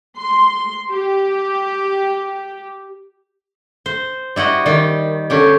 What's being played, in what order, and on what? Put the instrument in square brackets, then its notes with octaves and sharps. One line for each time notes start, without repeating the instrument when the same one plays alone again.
[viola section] C6
G4
[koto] C5
G3 E4 F#4 D#5
D#3 G3
D3 C#4 G4